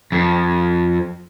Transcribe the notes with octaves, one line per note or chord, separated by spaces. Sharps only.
F2